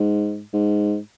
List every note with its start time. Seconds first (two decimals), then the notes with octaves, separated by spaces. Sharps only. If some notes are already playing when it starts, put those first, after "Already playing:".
Already playing: G#2
0.53 G#2